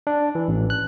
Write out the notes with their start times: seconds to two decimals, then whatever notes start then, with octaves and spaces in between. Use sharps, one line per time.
0.07 D4
0.35 E3
0.48 A1
0.70 F#6